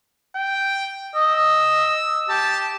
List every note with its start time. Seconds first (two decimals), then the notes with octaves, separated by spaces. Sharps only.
0.36 G5
1.15 D#5 E6
2.29 G4 A5